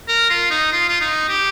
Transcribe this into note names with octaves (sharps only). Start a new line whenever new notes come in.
A#4
F4
D#4
F4
F4
D#4
G4